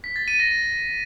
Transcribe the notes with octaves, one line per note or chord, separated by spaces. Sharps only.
B6
A6
D#7
A#6